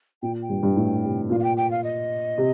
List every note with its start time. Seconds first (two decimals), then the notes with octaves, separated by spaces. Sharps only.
0.22 A#2 G5
0.42 G5
0.49 G2
0.63 G2
0.76 A2
1.04 C3
1.30 A#2 F5
1.40 F5
1.44 G5
1.57 G5
1.71 F5
1.84 D#5
2.38 C3